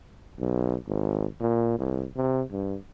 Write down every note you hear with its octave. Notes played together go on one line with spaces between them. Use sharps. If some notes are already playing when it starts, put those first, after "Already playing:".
B1
G#1
A#2
C2
C3
G2